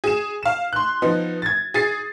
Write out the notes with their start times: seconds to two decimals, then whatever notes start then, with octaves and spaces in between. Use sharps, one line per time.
0.04 G#4 E7
0.43 F5 E7
0.73 C6 F#6
1.02 F3 B3 D#4
1.42 G#6 A6
1.74 G#4 A6 C7